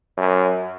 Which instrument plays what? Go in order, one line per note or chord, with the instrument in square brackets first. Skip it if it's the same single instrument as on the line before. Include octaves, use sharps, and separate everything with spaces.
[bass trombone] F#2